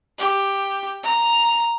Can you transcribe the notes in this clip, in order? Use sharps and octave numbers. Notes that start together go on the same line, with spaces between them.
G4
A#5